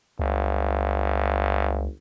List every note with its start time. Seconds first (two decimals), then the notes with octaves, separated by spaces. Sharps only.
0.19 G1 C#2